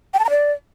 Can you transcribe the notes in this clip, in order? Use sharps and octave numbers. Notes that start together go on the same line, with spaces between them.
G5
A5
A#5
D5